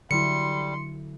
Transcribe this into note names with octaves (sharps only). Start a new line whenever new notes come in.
D3 F#3 G3 E4 C6 C#7